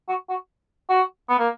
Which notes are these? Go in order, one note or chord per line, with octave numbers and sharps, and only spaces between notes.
F#4
F#4
F#4
B3
A#3